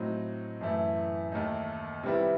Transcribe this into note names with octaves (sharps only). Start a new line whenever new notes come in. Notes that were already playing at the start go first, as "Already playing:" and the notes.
Already playing: A2 F#3 C4 D#4
F#2 E3 A3 E4
D#2 D#3 A3 D#4
C3 D#3 G3 B3 E4